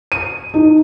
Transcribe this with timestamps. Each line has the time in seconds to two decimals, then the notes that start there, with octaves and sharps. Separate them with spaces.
0.12 D#7
0.54 D#4